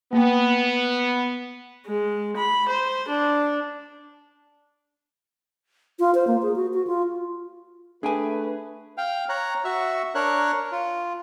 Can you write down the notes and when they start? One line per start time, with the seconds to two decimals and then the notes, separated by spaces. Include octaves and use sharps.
0.13 A#3 B3 G5
1.86 G#3
2.37 B5
2.69 C5
3.09 D4
5.99 F4
6.15 C5
6.27 A#3
6.42 G#4
6.56 F#4
6.73 F#4
6.87 F4
8.03 A3 D4 G#4 B4 G5 G#5
8.98 F5 G5
9.29 C#5 A#5 F#6
9.65 F#4 E5 C#6
10.15 D4 A#4 C#5 F#6
10.72 F4